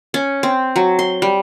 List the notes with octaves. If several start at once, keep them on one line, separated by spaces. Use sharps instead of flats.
C#4
C4
F#3
C6
G3